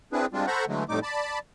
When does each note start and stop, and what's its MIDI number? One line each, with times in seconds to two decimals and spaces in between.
0.13 0.26 60
0.13 0.26 62
0.13 0.26 64
0.13 0.26 68
0.13 0.26 71
0.33 0.46 55
0.33 0.46 56
0.33 0.46 60
0.33 0.46 62
0.33 0.46 65
0.47 0.65 69
0.47 0.65 72
0.47 0.65 78
0.47 0.65 82
0.47 0.65 83
0.47 0.65 85
0.68 0.84 50
0.68 0.84 52
0.68 0.84 54
0.68 0.84 56
0.68 0.84 57
0.89 0.99 41
0.89 0.99 45
0.89 0.99 55
0.89 0.99 57
0.89 0.99 63
0.89 0.99 86
1.03 1.39 74
1.03 1.39 81
1.03 1.39 83